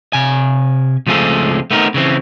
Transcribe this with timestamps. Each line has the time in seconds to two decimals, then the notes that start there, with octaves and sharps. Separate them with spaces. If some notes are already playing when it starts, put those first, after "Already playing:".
0.13 C3 G#5
1.07 C#2 F3 A3 C4 G#4 A4
1.71 A3 B3 C4 D#4 A#4
1.94 C#3 E3 C4